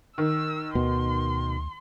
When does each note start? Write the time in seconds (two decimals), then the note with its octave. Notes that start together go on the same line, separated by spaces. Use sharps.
0.18 D#3 E6
0.75 D2 B2 C6